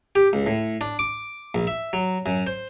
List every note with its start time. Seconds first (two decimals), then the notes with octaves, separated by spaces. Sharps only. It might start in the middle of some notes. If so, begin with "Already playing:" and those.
0.15 G4
0.33 C#2
0.46 A2
0.81 D4
0.99 D6
1.55 A#1
1.67 E5
1.93 F#3
2.26 F#2
2.47 C5